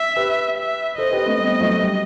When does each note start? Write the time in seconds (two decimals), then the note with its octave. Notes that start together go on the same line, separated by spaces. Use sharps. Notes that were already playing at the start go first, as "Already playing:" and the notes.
Already playing: E5
0.16 G4 B4
0.57 E5
0.98 A4 C5 D#5
1.12 G4 B4
1.26 A3 C4
1.40 G3 B3
1.61 F#3 A3
1.81 G3